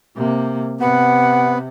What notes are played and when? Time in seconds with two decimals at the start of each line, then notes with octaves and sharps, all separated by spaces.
0.16 C3 A#3
0.80 C3 B3 F#5